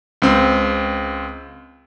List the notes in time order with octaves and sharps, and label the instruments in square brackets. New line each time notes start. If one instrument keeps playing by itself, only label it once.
[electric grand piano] C#2 C4